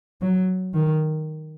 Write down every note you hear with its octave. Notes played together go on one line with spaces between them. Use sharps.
F#3
D#3